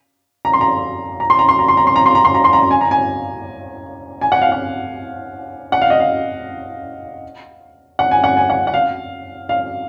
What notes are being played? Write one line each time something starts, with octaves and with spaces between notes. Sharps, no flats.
A#5
C6
A#5
A#5
C6
A#5
C6
A#5
C6
A#5
C6
A#5
C6
A#5
C6
A#5
C6
A#5
G#5
A#5
G#5
G#5
F#5
F5
F#5
F#5
F5
D#5
F5
F#5
G#5
F#5
G#5
F#5
F#5
F5
F5